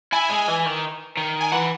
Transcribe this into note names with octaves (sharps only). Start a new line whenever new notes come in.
E4 G#5
G#3
E3
D#3
D#3
G#5
E3 F#5